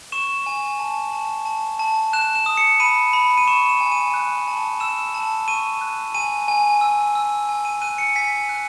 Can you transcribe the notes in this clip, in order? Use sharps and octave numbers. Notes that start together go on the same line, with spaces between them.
C#6 E7
G#5
A5
A5
A5
A5
F#6 E7
E7
D#6
C#7
B5 D#7
B5
D#7
C#6 E7
E7
G#5
D#7
F#6
A5
E6 E7
A5
C#6 D#7
F#6
G#5 D#7
G#5
E6
E6
G#5
D#7
F#6 D#7
C#7
G#5 B6
F#6